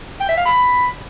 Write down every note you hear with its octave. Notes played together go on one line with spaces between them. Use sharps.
G5
E5
F5
B5